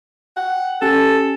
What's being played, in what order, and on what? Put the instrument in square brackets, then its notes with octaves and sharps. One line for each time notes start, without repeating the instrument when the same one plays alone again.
[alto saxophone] F#5 [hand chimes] G5
[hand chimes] C#4 G4 G#5 [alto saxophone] A4